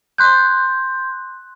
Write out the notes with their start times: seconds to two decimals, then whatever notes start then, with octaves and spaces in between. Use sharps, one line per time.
0.18 C6 F#6 G6